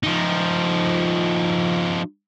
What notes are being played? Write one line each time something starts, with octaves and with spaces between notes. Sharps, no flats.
F3 D#4